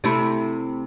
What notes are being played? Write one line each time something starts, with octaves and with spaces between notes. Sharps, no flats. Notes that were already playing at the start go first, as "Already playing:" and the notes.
C3 A3 E4